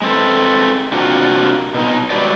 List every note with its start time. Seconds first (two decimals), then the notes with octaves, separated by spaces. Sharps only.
0.02 G#3 C4 A4 B4
0.92 C3 A#3 D4 F4 F#4
1.74 B2 D#4
2.10 F#3 G#3 G4 B4 C5 D5